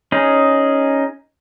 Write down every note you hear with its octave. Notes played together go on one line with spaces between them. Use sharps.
C#4 D#4 G#4